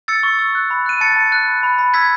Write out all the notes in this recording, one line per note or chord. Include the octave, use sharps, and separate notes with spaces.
E6 A6 C#7
C#6
E6
F#6
B5
F#6 D#7
A5 A6 C#7
A5
F#6
B5
B5
B5
E6 G#6 B6